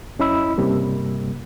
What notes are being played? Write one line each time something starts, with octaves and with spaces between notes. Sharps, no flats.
F#2 C#4 E4 D#5 B5 E6
C#2 G2 C3 G3 A#3